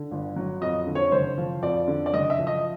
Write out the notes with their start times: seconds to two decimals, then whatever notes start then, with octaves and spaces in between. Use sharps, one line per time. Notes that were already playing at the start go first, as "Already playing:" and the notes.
Already playing: D3
0.11 G1
0.36 F#3
0.61 F2 D#5
0.87 D3
0.95 C#5
1.12 F#1 C5
1.38 F3
1.63 F2 D5
1.88 D3
2.06 D5
2.13 F#1 D#5
2.30 E5
2.39 F3
2.47 D#5